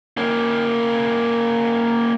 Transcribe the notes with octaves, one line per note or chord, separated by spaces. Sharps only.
A#3 C#4